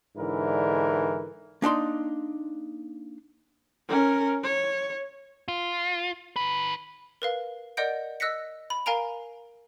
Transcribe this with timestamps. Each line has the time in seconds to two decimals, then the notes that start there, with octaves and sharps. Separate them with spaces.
0.16 G#2 D3 E3 D4 E4 A#4
1.62 A#3 D4 D#4 C6
3.89 C#4 A#4
4.43 C#5
5.48 F4
6.36 D#3 B4
7.22 A#4 B4 F5
7.77 A#4 D5 D#5 F#5 G6 D7
8.20 D#5 E6 F#6 A#6 B6 C#7
8.70 B5
8.86 A#4 F5 G#5 A#5 D7 F7